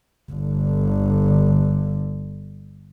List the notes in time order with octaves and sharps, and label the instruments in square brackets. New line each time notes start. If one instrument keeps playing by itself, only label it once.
[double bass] G1 D3